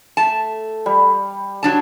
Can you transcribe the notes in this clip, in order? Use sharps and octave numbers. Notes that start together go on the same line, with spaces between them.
A3 A5
G3
F#3 D4 A5